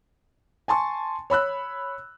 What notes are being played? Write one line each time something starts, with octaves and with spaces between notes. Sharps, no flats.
G#5 A5 C6 C#6
C#5 B5 E6 F#6